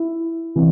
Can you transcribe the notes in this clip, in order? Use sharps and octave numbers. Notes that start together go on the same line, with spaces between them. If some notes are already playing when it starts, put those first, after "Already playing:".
Already playing: E4
C3 E3